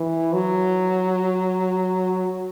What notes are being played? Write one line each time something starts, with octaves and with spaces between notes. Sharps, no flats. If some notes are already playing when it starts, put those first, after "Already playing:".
Already playing: E3
F#3